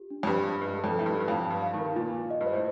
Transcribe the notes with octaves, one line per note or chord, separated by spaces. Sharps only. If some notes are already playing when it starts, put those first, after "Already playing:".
Already playing: F4 G4
D4
F2
G2 G4
D4
G2 D#5
A4
F2
A2 A4
G2
D#4
G2
F2 F5
A5
G2
F5
D#3
A#4
A#2 F4
F4
D#5
G2
C5
A2